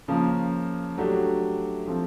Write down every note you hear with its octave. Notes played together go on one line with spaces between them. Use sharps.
C#3 F3 A#3
F#3 A3 D4 G4
F3 A3 C4